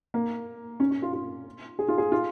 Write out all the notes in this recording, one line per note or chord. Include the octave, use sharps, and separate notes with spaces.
A#3
C#4
C#4
F4
F4
G#4
F4
G#4
F4